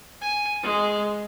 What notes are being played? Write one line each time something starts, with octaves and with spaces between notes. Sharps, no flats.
G#5
G#3